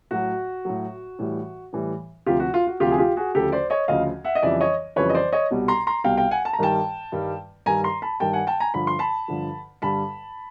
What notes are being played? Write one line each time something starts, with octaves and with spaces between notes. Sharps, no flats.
A2 F#3 F#4
A2 F#3
A2 E3 G3
A2 E3 G3
D2 C3 F3 F4 G4
F#4
F4
F#4
D2 C3 F3 F4 G4
G#4
F4 G4
F#4 G#4
D2 C#3 F3 G4 A4
C5 D5
C#5 D#5
D2 C#3 F3 D#5 F5
E5 F#5
D#5
F2 C#3 E3 G3 D5 E5
C#5 D#5
F2 C#3 E3 G3 B4 C#5
D#5
C5 D5
C#5 D#5
C2 B2 G3
A#5 C6
A#5 C6
C2 B2 G3 F5 G5
F5 G5
F#5 G#5
A5
A#5
G2 D#3 G3 G5 A5
G2 D#3 G3
G2 D#3 G3 G#5 A#5
A#5 C6
A5 B5
G2 D#3 G3 G5 A5
F#5 G#5
G5 A5
G#5 A#5
G2 D3 F3 B5
C6
A5 B5
G2 D3 F3
G2 D3 G3 A5 B5